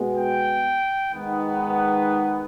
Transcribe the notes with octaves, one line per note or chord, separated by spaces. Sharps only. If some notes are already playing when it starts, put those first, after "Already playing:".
Already playing: B2 G#3 B3
G5
G#2 D#3 G#3 B3